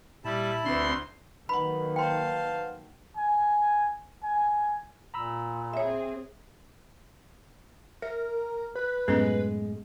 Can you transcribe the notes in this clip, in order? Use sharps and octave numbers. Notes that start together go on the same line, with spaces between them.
A#2 G3 E4 A5 B5
D2 C4 D4 B4 C6
D#3 F#3 A#3 B4 F#5 B5
C5 F5 G5 A5 C6
G#5
G#5
A#2 A#5 B5 E6
C4 G#4 C#5 E5
A#4 E5
B4
F#2 A2 G#3 B3 C#4 A4